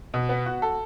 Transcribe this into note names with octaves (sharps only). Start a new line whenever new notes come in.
B2
B3
F#4
A4